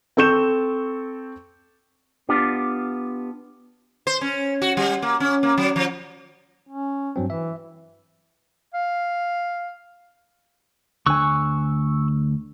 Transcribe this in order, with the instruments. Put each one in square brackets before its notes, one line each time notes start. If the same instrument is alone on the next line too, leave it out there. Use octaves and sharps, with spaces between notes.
[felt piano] C4 A4 C#6 G6 E7
[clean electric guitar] B3 D4 F4 G4
[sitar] C5
C#4
F#4
G3
A#3
C#4
A#3
F#3
F3
[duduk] C#4
[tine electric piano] G2 F#3 C4
[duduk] E3 [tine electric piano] E5
[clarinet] F5
[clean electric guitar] D2 G#5 [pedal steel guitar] C#6 E6 F#6